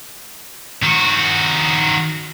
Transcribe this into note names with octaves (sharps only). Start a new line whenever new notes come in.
D#3 F#4